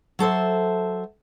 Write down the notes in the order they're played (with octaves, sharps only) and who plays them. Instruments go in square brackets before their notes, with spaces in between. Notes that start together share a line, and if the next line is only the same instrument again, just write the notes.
[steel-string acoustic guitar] F#3 A4 C5 E5